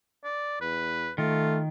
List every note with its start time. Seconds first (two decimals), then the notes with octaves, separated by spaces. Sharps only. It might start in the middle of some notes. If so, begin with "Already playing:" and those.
0.24 D5
0.61 E2 B4
1.18 D#3 A3 F4